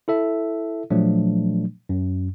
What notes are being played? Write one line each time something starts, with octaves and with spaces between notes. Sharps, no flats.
E4 A4 E5
A#2 F3 F#3 A3 D4
F#2